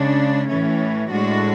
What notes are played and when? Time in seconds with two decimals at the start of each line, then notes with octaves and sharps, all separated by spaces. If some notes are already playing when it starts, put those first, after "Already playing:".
Already playing: C#3 G#3 D4
0.49 A2 E3 A3 C#4
1.11 A2 G#3 D4 F#4